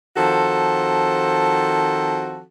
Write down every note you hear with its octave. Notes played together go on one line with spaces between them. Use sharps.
D#3 F3 C4 F#4 A4